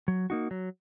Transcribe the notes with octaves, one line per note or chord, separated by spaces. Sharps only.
F#3
A#3 D#4 F#4
F#3